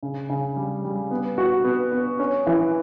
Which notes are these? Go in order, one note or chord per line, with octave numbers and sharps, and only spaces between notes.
C#3
C#3
G3
G3
B3
F#4
B3
B3
C#4
E3